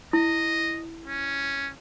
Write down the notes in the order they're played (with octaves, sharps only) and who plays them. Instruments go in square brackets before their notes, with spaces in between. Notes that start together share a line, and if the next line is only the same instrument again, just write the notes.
[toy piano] E4 [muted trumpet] D#5
[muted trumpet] C#4